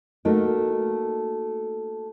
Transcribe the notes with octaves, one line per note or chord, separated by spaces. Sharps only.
A3 A#3 D#4 F#4 A#4